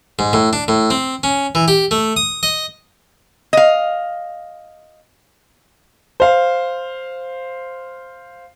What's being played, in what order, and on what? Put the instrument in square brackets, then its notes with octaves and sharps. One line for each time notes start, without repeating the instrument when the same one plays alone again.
[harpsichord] G#2
A2
D4
A2
C4
C#4
E3
G4
A3
D#6
D#5
[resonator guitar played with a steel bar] D#5 F5
[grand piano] C5 F5